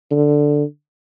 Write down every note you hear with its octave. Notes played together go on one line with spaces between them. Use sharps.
D3